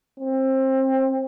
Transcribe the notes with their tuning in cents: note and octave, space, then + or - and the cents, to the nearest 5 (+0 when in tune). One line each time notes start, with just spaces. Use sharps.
C4 +25